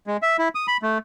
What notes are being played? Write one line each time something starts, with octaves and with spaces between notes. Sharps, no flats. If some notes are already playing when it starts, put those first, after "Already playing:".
G#3
E5
E4
D#6
B5
A3